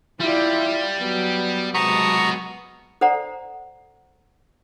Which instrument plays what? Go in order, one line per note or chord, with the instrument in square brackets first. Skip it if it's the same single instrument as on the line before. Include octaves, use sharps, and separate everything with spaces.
[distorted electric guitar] G3 [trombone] E4 [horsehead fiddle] F4 D5
[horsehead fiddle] F#3 [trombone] B3
[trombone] C3 [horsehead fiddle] F#3 G#3 [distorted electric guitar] B3 A5 [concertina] A#5 C#6 D#6
[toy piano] A4 C5 D5 F#5 A#5